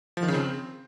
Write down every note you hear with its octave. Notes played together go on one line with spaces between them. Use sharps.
F3
D#3
C#3
C4